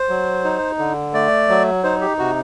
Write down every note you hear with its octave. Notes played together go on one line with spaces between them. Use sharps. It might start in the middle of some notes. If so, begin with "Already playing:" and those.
Already playing: C5
F#3
D#4
D3
A3 D5
F#3
D#4 C5
G4
C3 F#4